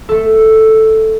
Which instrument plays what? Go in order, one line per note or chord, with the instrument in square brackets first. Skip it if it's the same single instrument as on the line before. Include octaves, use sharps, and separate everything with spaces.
[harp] A3 A4